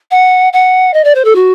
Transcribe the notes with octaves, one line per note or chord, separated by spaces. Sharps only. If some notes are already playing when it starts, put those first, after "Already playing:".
F#5
F#5
D#5
D5
C5
A4
F#4